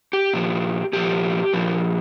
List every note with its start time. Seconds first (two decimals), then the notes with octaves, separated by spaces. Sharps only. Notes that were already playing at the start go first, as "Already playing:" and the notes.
0.13 G4
0.33 A#2 F3
0.93 A#2 F3 G4
1.54 A#2 F3